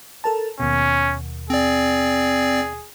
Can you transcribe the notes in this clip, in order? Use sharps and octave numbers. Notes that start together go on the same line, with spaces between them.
A4 A#4 A5
D#2 B2 C#4
C4 G#4 D5